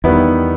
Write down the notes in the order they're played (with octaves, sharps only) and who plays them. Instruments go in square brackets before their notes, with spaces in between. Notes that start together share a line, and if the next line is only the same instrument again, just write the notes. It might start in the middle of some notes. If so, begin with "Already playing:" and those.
[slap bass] E2 [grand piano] D#3 G3 B3 E4